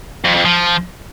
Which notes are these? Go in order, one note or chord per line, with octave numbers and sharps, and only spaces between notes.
F2
F2
F3